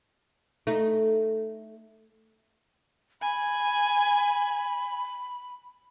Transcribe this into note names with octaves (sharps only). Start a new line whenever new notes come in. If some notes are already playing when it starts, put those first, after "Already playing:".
A3 D#4
G#5 B5